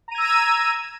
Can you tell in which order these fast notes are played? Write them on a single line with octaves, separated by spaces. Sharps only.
A#5 D#7 G#6 E6